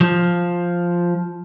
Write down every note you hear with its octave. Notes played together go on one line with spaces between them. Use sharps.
F3